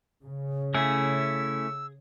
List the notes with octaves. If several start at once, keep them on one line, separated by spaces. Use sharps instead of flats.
C#3
A3 C#4 E4 G#4 E6